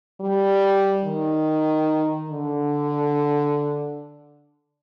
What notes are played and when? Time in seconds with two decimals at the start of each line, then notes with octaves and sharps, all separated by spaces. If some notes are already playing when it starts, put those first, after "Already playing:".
0.20 G3
1.04 D#3
2.30 D3